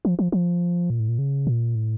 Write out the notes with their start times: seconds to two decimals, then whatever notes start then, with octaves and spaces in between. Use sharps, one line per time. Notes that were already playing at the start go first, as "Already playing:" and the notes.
0.05 F3
0.19 F3
0.32 F3
0.90 A#2
1.00 A2
1.09 A#2
1.19 C#3
1.47 A#2
1.75 A2